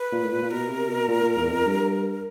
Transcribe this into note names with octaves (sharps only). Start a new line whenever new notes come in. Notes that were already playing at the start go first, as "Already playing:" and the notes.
Already playing: B4
A#2
A2
A#2
A#2
B2 A#4
C3
B2
A#2
A#2
E2
F2
G2